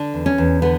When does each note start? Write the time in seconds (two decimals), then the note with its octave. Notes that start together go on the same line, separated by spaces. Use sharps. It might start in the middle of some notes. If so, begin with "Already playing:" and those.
Already playing: D3 D4
0.14 E2
0.26 C#4
0.38 E2
0.62 D3 B3